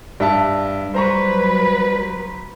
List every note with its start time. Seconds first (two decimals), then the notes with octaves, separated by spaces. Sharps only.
0.20 G2 G3 E5 A5
0.94 F#3 B4 C5 A#5 C#6